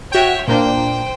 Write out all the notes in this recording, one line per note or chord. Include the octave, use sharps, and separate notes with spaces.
F#4 C#5 E5 G5
A#2 A#3 D4 C5 G5